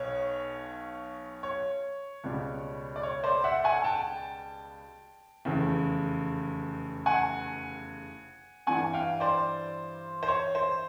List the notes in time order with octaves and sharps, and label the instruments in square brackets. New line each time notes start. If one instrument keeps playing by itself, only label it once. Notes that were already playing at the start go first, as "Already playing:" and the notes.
Already playing: [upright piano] B1 B2 C#5
C#5
C#2 B2 G3
D5
C#5
C5 D5
E5 F#5
F#5 G#5
G5 A5
F1 E2 C#3
F#5 G#5
G2 E3 G3 F#5 G#5
F5 G5
C5 D5
C5
C#5
C5